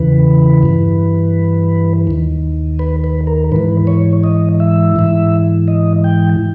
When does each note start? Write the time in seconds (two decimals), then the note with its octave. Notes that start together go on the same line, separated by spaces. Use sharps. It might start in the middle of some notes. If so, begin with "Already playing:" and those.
Already playing: E2 C#3 E3 B4
0.63 G2 E3
2.07 D#2 D#3
2.79 B4
3.04 B4
3.27 A#4
3.52 G#2 E3 B4
3.87 C#5
4.23 D#5
4.60 E5
4.96 G#2 E3
5.68 D#5
6.04 G5